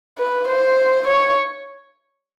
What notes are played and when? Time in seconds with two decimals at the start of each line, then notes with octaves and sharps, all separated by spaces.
0.18 B4
0.48 C5
1.07 C#5